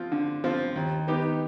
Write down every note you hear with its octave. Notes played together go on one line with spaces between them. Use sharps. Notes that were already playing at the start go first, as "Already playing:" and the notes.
Already playing: F3 C4 F4
D3
F3 C4 F4
D#2
D#3 B3 D#4 G4